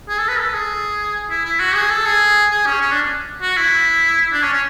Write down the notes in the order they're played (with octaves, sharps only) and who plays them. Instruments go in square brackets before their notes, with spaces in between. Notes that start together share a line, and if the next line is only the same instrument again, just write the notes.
[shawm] G#4
A4
B4
A4
G#4
E4
E4
F#4
G#4
A4
G#4
G#4
C#4
C#4
D4
F#4
E4
D4
C#4
C#4